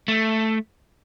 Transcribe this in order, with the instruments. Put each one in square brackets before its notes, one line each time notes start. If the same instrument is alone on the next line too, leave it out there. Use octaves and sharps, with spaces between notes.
[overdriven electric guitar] A3